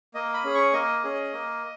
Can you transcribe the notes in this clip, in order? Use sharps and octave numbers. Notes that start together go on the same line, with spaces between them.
A#3 D#5
B5
C#4 G#4
C#6
A#3 D#5
C#4 G#4
A#3